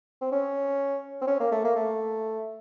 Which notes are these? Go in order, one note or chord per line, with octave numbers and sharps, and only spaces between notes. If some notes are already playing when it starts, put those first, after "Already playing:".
C4
C#4
C4
C#4
A#3
A3
A#3
A3